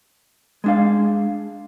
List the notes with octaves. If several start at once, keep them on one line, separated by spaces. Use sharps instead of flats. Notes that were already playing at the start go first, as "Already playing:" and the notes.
G#3 D4 F5